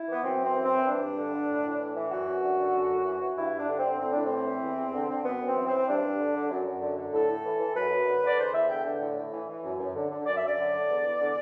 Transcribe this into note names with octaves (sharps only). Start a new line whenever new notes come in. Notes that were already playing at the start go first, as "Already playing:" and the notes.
Already playing: E4
E3 B3
F#2 C4
F#2
C4
E3
C4
E3
G2 D4
G2
D3
D3
A2
A2
E3
E3
F#2 F#4
F#2
D3
D3
F#2
F#2
E3
E3
G2 E4
G2
D4
D3
D3 C4
A2 C4
A2 D4
C4
E3
E3
E2
E2
D3
D3
F#2 B3
F#2
C4
E3
E3 C4
G2 D4
G2
D3
D3
F#2
F#2
D3
D3
A2 A4
A2
E3
E3
F#2 B4
F#2
D3
D3 D5
E2 C5
E2 E5
D3 G5
D3
A2
A2
E3
E3
F#2
F#2
D3
D3
F#2 D5
E5
F#2
D5
D3
D3
E2
E2
D3